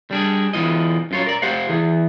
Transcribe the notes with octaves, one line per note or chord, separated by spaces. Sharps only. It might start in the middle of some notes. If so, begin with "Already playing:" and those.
G3 D4 G#4
E2 C3 E3 F4 D#5
F#2 F4 C#5
A#4 D5
G4 C5 F5 F#5
E3 G#4